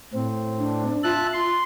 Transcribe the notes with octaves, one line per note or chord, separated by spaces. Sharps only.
A2 C4
D4
F4 E5 A5 F#6
C6